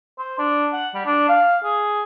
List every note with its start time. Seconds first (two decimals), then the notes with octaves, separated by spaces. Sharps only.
0.19 C5
0.39 D4
0.73 F#5
0.94 G3
1.06 D4
1.29 F5
1.64 G#4